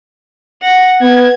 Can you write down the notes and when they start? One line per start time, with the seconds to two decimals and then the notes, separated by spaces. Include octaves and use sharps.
0.62 F#5 A#6
1.02 B3 G#6